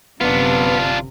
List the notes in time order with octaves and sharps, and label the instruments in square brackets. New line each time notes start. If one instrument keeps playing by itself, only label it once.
[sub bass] G1 [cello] F#2 C3 [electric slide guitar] B3 [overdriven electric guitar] D4 F4